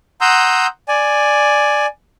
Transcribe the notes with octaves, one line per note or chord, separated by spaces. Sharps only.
F#5 A#5 C6 D#6 E6 G6
D5 G#5